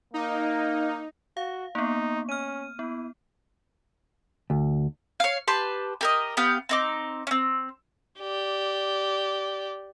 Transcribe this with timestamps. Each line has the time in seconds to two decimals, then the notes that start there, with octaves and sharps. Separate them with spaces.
0.14 A#3 D#4
1.37 F#4 F5
1.75 A#3 B3 D#4
2.29 C#4 F6 D#7
2.79 B3 E4
4.50 D2
5.20 C#5 F5
5.48 G4 B4 A5 C6
6.01 G4 A#4 D#5
6.37 B3 G4 F5 G6
6.69 C4 D#4 D6
7.27 C4 C#4
8.20 G4 D5